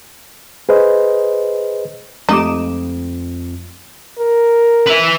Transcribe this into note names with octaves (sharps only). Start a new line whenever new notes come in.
G#4 B4 C5 D#5
F2 G#3 A3 D#4 G4 D6 D#6 E7
A#4
B4 E5